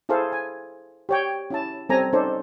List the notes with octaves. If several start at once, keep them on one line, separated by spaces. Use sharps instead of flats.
E4 G#4 A4 C5 F5
G#5
G4 C#5 G5
C#4 E4 A5
G3 C4 C#4 A4 G#5 A#5
C#4 D#4 A4 C5 D5